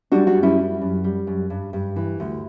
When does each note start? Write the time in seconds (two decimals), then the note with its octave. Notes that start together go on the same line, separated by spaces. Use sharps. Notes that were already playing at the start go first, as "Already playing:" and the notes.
0.12 G3 D4 F#4
0.27 D4 F#4
0.36 F#2
0.43 C#4 E4
0.58 G3
0.81 F#2
1.04 G3
1.27 F#2
1.50 G2
1.73 G2
1.96 E3
2.20 D2